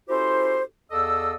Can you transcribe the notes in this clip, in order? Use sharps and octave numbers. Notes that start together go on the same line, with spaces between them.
C#4 E4 F#4 G4 A4 C5
E2 A4 D5 D#5 F5 E6